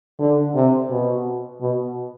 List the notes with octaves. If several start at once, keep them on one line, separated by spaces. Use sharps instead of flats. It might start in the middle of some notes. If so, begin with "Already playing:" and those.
D3
C3
B2
B2